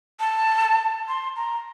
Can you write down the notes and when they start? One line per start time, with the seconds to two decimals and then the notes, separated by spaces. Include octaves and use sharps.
0.20 A5
1.08 C6
1.36 A#5